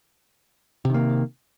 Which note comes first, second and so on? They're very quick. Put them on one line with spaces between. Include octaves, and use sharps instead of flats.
C3 D#3 A#3